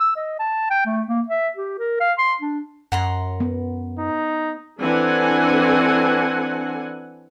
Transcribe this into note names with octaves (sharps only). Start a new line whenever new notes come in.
E6
D#5
A5
G5
A3
A#3
E5
G4
A#4
F5
C6
D4
F#2 F#5 A#5 C6
B3
D#4
E3 C4 D4 A4 F#5 G#5